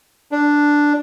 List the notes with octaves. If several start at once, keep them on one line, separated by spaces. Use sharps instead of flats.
D4